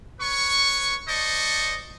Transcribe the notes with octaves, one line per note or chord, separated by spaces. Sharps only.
B4 C#5 C#6
C5 D5 D#5 A5 C#6